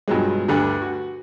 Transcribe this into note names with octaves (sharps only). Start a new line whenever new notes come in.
G2 B2 F3 F#3 G#3
D2 G2 D3 G3 D4
F#4